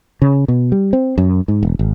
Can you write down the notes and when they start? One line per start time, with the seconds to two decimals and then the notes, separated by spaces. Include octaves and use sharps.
0.22 C#3
0.48 B2
0.72 G3
0.93 C4
1.18 F#2
1.48 G#2
1.63 E1
1.79 G#1